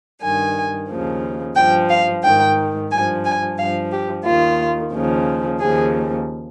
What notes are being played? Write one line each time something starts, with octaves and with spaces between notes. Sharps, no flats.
G2 D#3 G#5
D#2 C#3 F3
G2 F3 G5
F5
G#2 D#3 G5
G2 F3 G#5
G#5
G2 F3 F5
G4
D#2 D#3 F4
D#2 C#3 F3
D#2 C#3 F3 G#4